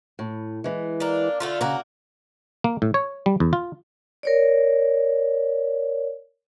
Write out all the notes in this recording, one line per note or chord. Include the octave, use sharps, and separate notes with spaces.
A2
E3 G#3
A#3 D4
D3 A3 F4
C#3 A#3 F#4 A#5
A#3
A2
C#5
G3
E2
F4
A#4 C#5 D5